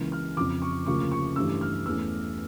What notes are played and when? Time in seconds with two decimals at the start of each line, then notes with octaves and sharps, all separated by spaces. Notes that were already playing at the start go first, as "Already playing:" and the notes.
Already playing: C#2 C#3 E3 A#3
0.12 F6
0.37 F2 C#3 F3 D6
0.62 C#6
0.86 D2 C#3 F3 A#3 C#6
1.12 C#6
1.36 G2 E3 A3 C#4 E6
1.61 F6
1.86 E2 E3 A3 C#4 E6